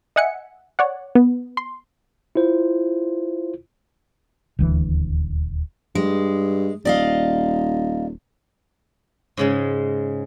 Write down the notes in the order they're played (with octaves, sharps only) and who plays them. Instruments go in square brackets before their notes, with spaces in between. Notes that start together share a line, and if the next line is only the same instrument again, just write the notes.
[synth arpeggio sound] D#5 E5 F#5 G#5 C#7
C#5 D5 F#5
B3
C6
[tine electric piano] E4 F4 C5
[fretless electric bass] D#1 D2 E3
[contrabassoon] G2 [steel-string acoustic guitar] G#3
[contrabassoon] D#1 [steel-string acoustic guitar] D5 D#5 F5
[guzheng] G#2 C#3 G#3